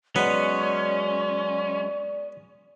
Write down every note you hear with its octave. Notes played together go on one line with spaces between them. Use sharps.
F#3 G#3 B3 C#4 D5